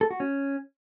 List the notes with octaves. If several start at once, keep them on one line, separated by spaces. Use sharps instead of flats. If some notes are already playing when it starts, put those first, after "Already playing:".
A4
F#4
C#4